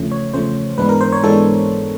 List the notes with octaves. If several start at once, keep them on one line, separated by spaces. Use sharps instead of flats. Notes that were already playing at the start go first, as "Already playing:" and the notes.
Already playing: E2 C#3 F3 A3 C#4
C#5
E2 C#3 F3 A3 C#4 C5
G#2 E3 G#3 B3 D4 B4
A#4
C5
C#5
G#2 E3 G#3 B3 D4 A4